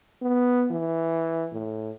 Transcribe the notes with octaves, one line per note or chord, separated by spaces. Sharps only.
B3
E3
A2